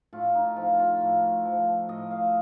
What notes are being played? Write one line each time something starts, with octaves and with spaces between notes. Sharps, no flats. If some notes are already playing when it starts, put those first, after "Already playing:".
A2 F4
D#4
F3 F4
F4
A2
F3
A2 D#5
F5